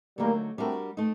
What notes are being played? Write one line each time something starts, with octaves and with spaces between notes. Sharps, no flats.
D3 F#3 G3 A3 A#3 D#4
G3 A3 C4 D4 F#4 A#4
A3 C4 D#4